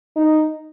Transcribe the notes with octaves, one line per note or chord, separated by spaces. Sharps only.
D#4